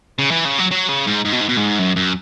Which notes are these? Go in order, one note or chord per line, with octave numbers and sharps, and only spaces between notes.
C#3
E3
C#3
F#3
F#3
C#3
G#2
G#2
B2
G#2
B2
G#2
F#2
F#2